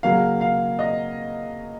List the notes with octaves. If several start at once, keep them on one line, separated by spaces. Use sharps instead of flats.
C#3 F#3 A#3 F5
F5
D#5